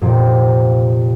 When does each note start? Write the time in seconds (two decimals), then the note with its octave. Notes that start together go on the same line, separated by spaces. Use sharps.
0.01 F1 A#2 C4